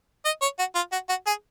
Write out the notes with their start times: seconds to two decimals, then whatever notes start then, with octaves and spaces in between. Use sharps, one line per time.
0.25 D#5
0.42 C#5
0.59 F#4
0.75 F4
0.92 F#4
1.09 F#4
1.27 G#4